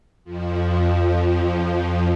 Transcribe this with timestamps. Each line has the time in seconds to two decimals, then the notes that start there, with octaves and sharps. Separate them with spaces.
0.24 F2 F3